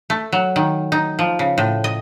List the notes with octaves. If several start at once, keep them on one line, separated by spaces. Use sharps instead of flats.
A3
F#3
D#3
D#4
F3
C#3
A2
D#5